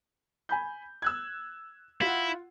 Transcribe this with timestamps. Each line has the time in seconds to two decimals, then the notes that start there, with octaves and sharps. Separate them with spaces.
0.49 G#5 B5 G6
1.02 E6 F#6 G#6
2.02 E4 F4 F#5